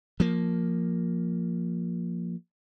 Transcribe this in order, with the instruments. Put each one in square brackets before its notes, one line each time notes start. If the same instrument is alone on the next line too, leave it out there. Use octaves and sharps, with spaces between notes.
[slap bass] F3 A#3